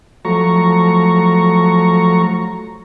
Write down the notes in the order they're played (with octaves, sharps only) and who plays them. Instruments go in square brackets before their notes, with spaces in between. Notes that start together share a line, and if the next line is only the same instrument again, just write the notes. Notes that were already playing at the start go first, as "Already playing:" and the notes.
[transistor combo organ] F3 F#3 A3 A#5 C#6